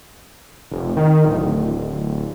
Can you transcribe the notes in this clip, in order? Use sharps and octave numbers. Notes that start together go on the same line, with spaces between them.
F1
D#3
D1